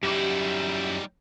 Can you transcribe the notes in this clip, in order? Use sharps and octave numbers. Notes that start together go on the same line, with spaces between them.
F#2 G3 D#4 E4 G4